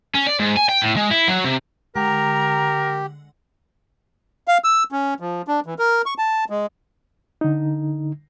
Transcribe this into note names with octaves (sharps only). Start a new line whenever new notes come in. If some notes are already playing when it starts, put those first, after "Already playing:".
C#4
D5
G#2
G#5
G5
A2
G#3
E4
F#3
C3
D3 G#3 G4 A#4 F#5 A#5
F5
E6
C#4
F3
D4
E3
A#4
C#6
A5
G#3
D3 D#4